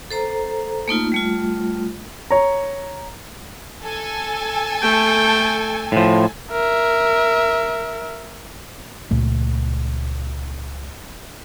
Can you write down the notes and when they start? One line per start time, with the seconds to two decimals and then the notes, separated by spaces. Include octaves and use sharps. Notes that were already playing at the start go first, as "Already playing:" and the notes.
0.11 A4 C5 A#5
0.88 A3 A#3 D#4 F4
1.12 G3 A3 F4
2.31 C#5 A#5
3.83 A4 G#5
4.82 A3 G5
5.92 A2 F3
6.51 A#4 E5
9.11 C#2 A#2 A3